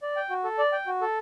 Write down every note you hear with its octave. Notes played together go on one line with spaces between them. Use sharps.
D5
G5
F#4
A4
D5
G5
F#4
A4